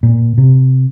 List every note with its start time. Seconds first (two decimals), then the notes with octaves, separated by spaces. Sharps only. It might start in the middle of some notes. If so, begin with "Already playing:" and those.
0.03 A#2
0.38 C3